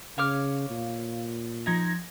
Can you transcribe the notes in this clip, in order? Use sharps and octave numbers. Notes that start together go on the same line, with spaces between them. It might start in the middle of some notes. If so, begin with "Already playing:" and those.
C#3 C#5 F5 D6 F6
A#2
F3 D#4 G#6 A#6